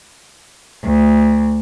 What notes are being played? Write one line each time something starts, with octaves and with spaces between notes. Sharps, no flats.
D2